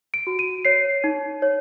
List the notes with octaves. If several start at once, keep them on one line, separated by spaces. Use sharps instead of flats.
D7
F#4
D#7
C#5 C7
D#4
C#5